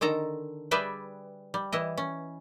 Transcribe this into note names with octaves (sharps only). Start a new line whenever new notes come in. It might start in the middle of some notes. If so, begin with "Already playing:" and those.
D3 D#3 A4 A#5
G3 G#4 B4 D5 E5 G5
G3
E3 E4 D#5
C#4